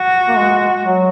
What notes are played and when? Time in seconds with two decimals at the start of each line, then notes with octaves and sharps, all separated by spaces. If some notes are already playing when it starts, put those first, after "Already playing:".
Already playing: F#4
0.28 A#3
0.37 G#3
0.84 F#3